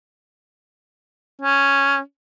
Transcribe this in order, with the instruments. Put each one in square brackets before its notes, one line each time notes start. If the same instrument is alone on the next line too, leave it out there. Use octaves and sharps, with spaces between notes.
[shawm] C#4